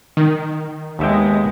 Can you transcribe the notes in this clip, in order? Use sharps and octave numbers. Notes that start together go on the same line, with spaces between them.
D#3
D#2 G#3 B3 E5 G5